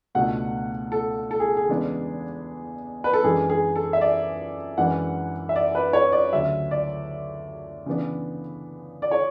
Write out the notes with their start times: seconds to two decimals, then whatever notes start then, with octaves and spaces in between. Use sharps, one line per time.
0.15 C#2 B2 A3 D4 F#5
0.92 A4
1.31 A4
1.40 G#4
1.57 G#4
1.69 E2 C#3 G#3 B3 D4
3.04 B4
3.14 A4
3.23 F#2 E3 G#3 D4 G#4
3.50 G#4
3.76 A4
3.93 E5
4.01 D5
4.78 F#2 E3 G#3 D4 F#5
5.49 E5
5.56 D5
5.75 B4
5.93 C#5
6.12 D5
6.32 D2 C#3 F#3 E5
6.71 D5
7.86 C#3 E3 B3 D4
9.02 D5
9.11 C#5